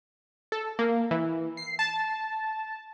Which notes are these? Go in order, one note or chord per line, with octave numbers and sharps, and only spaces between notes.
A4
A#3
E3
C7
A5